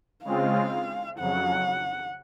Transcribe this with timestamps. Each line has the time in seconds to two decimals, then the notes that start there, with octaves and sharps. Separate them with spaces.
0.24 C#3 G#3 C4 F4 F5
1.19 F2 C#3 F#3 F#5